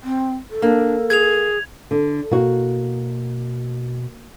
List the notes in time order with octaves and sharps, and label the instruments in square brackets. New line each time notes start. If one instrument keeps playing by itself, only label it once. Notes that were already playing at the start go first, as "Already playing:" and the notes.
[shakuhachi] C4
A4
[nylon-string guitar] A#3 [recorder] D4
[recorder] G#4 [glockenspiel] G#6 F7
[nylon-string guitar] D3
[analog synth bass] B2 [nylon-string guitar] A#3 F#4